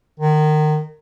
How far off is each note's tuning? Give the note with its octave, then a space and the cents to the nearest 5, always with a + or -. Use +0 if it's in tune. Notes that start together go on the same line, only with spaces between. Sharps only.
D#3 -25